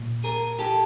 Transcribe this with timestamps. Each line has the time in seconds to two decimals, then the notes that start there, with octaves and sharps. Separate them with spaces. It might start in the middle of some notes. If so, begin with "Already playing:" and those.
Already playing: A#2
0.24 G#4 A#4
0.59 G4 A4